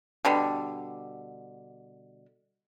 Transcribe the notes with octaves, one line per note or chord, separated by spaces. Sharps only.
B2 D3 G3